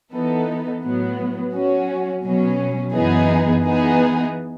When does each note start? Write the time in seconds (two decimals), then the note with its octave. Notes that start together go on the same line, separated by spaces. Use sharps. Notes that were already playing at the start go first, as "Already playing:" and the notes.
0.12 E3 B3 D#4 A4
0.83 A2 F#3 B3
1.54 F#3 C#4 F#4
2.24 B2 F#3 C#4
2.94 F#2 E3 B3 D#4 G#4
3.65 E3 B3 D#4 G#4